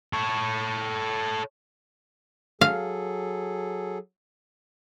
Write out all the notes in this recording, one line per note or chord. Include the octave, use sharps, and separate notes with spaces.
A4 C#5
F#3 G#4 A4 F5